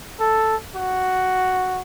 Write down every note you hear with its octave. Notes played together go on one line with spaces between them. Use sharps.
A4
F#4